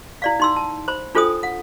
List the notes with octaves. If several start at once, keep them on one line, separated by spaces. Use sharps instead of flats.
E4 D5 F5
D#4 C6 E6
A5
C5 B5
D4 F4 A4 C5 G5 D#6
F#5